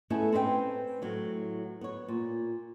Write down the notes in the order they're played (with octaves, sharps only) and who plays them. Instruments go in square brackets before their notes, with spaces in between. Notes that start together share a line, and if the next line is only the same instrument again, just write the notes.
[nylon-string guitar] A3 B3 C#4 E4 G#4 A4
C4 C#4 B4 E5 G5
A2 F#3
B3 C#5
A#2